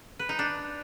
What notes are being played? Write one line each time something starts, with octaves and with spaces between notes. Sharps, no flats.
B4
D#4
D4